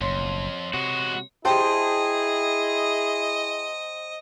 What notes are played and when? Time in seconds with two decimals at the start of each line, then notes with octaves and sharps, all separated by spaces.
0.01 F#1 B1 F2 C#5 C6
0.74 C3 G#3 B3 F#4
1.45 E4 G#4 C5 D#5 G5 A5